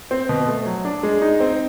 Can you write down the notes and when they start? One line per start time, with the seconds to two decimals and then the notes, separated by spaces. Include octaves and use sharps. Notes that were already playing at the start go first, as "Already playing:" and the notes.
0.11 C4
0.29 B2
0.47 A3
0.66 F#3
0.85 D4
1.03 G#3
1.22 D#4
1.40 C4